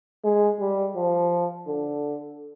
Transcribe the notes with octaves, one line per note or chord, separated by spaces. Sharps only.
G#3
G3
F3
D3